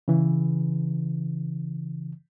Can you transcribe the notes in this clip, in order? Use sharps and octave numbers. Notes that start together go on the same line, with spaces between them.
C#3 E3